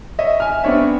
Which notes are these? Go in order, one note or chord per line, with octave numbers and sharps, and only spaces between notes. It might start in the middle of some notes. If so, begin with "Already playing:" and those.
C#5 D#5 E5
G#5 F6
B3 C4 D4 C#5 E5